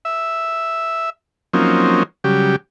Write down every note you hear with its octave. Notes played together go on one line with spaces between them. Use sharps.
E5
F3 F#3 A#3 C4 C#4 D#4
C#3 F#3 G3 G4